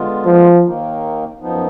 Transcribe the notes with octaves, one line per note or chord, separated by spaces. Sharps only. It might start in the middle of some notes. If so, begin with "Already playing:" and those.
Already playing: D3 G#3 B3 F4
F3
D#2 D#3 A#3 D#4
F#2 F3 B3 D#4